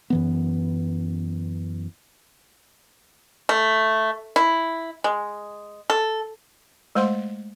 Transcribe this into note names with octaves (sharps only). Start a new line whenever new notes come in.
F#2 E3 B3
A3
E4
G#3
A4
G#3 A3 C5 F#5 C6